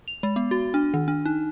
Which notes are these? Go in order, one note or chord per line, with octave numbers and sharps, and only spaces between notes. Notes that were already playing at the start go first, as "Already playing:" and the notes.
F7
G#3
B3
F#4
D4
D#3
D4
D#4